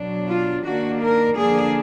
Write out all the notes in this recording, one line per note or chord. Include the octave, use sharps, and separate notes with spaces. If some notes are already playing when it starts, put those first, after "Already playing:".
Already playing: B2 F#3 D4
F4
D#3 A#3 D4 F#4
A#4
D3 F3 A#3 D4 G#4